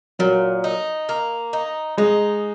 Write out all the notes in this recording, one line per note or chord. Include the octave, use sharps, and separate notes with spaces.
A#2 F#3
D#4
A#3
D#4
G#3 D#4